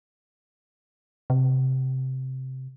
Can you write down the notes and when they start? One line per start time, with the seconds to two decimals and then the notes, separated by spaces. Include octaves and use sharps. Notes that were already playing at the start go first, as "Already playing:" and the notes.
1.30 C3